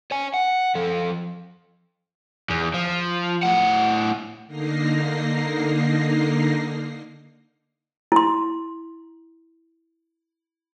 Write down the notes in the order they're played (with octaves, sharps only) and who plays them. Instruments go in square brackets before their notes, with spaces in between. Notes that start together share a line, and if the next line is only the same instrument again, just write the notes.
[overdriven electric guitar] C#5 G#5
F#5
F3 A4
E2
F3
A2 F#5
[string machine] D3 A#3 D#4 A#6 C7
[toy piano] E4 C6